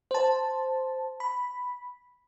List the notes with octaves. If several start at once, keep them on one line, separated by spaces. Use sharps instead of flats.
C5 A5
B5